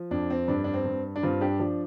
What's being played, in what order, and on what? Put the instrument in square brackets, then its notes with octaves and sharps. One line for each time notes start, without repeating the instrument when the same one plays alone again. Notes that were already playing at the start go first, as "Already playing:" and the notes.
Already playing: [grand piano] F3
F2 D4
C4
G2 D4
D4
C4
G2
D4
G2 C4 F4
D4 G4
F3 D4